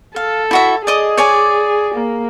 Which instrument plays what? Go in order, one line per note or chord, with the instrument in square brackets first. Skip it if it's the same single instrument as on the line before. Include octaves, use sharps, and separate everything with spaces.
[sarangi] A4 [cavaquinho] F5
[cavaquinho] E4 F#4 E5
[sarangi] G#4 [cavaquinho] D5 D#5 D#6
[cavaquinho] C#5 D5 G#5
[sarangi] A#3